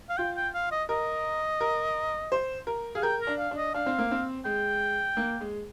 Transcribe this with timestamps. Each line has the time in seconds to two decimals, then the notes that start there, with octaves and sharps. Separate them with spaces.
0.10 F5
0.18 F4 G5
0.36 G5
0.54 F5
0.72 D#5
0.89 A#4 D#5
1.61 A#4
2.32 C5
2.67 A#4
2.95 G#4 F5
3.03 A#4 G5
3.21 A#4
3.27 D4
3.39 F5
3.51 D4
3.57 D#5
3.74 D4 F5
3.86 C4
3.99 A#3
4.11 C4
4.45 G#3 G5
5.17 A#3
5.41 G#3